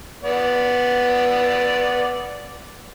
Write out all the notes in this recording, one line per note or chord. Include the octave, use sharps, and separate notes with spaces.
B3 D5